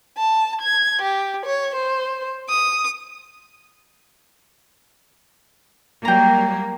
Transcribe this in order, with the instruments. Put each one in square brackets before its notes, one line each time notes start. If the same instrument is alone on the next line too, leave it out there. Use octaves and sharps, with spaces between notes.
[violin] A5
G#6
G4
C#5
C5
D#6
[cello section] F#3 G3 A#3 [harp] G5 A#5